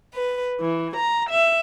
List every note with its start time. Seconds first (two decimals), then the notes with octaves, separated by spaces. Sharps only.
0.15 B4
0.59 E3
0.96 A#5
1.29 E5